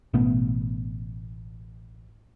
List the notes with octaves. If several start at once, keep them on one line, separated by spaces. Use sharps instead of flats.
A1 B2 A3 B3